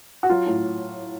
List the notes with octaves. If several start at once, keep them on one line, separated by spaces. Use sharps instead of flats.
F#4
F#3 F4
A2